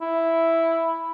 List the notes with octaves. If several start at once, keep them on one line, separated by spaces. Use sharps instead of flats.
E4